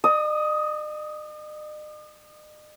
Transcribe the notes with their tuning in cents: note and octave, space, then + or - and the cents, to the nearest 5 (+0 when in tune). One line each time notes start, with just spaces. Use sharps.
D#5 -45 D#6 +15